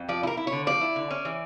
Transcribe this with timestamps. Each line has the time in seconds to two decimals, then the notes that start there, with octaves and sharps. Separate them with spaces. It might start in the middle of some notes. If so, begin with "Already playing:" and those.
Already playing: F2
0.09 F3 D5
0.23 E4
0.27 A#4
0.37 E4
0.47 C#5
0.52 D3
0.67 F3 D5
0.81 E4
0.96 D3
1.11 C#4
1.25 E3